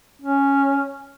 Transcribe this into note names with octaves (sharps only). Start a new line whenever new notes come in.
C#4